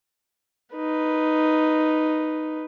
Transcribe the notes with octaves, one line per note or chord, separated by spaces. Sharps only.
D#4 B4